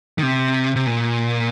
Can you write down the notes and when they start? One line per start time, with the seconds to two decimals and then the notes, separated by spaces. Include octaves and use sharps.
0.18 D#3
0.23 C3
0.76 C3
0.87 A#2